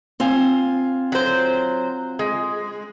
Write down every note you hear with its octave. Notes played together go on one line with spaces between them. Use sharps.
C4 F4 G#5
F#3 C5
G#3